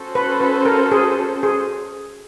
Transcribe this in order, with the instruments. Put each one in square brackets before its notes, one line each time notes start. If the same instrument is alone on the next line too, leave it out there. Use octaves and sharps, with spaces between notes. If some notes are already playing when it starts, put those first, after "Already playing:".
Already playing: [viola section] C#4 F#4 A4 C5
[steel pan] B4
B4
A#4
G#4
G#4